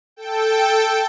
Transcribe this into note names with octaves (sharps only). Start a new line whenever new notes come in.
A4 G5